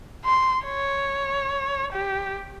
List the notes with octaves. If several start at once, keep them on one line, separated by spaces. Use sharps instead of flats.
C6
C#5
G4